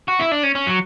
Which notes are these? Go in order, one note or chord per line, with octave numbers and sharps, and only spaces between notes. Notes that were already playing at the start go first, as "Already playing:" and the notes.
F#4
E4
D4
C#4
C#4
F#3